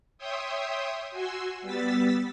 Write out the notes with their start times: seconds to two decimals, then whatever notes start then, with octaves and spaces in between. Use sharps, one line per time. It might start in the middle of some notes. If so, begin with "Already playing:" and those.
0.18 C#5 E5 G5 C6 D#6
1.11 F#4 G#5 C6 E6
1.62 G3 B3 E6 A6 B6